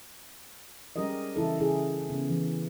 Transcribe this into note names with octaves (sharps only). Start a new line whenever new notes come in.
G3 G#3 C#4 G4 A#4 D#5
C#3 E3 E4 A4
C#3 E4 G#4
C#3 B3
E3